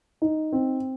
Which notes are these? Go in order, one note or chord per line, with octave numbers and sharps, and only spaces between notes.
D#4
C4